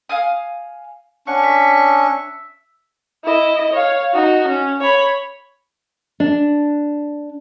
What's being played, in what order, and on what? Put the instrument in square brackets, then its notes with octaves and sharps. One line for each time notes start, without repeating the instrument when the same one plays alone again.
[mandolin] F5 G#5 D#6
[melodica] C#4 D4 C#6 [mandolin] F#5
[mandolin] E5
[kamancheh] E4 D#5
C#5 F5
D#4 F#4
C#4
C#5 B5
[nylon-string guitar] D4